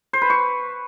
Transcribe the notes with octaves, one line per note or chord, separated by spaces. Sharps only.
C5
B4
C#6